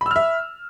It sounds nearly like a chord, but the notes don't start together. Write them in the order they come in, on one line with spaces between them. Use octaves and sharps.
B5 E6 F6 E5